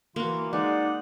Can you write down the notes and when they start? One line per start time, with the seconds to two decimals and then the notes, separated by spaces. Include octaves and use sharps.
0.16 E3 A#3 F4 F#4
0.53 G#3 D#4 D5 F#5